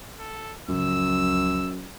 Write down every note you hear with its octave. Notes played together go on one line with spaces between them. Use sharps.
A4
C#2 F#2 F3 E6